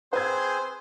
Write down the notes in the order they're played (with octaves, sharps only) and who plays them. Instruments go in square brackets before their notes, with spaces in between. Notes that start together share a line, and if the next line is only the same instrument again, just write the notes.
[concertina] C4 G#4 G#5 [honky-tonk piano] B4 G#6 [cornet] C5